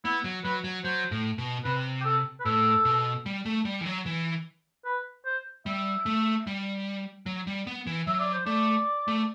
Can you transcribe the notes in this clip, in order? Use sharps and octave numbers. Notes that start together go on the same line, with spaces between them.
B3 E4
F#3
F#3 B4
F#3
F#3 C5
A2
B2
C3 B4
G4
A4
B4
A2 A4
B2
G3
A3
G3
E3
F#3
E3
B4
C5
G3 E5
A3
G3
F#3
G3
B3
E3
F#3 E5
D5
C5
A3 D5
A3